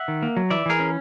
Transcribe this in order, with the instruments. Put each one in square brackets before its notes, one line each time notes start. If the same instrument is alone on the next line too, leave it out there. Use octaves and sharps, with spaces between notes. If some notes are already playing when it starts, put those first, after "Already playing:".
Already playing: [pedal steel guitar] E5 F#5
D#3
A#3
F#3
E3 D5 E5
E3 G#4 A#4
C#4